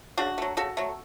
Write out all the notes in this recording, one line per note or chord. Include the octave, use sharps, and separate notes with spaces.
C#3 D4 F#4
F#3 A3
C#3 F#4 A4
F#3 A3